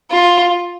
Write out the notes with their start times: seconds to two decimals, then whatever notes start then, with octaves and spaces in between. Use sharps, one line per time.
0.11 F4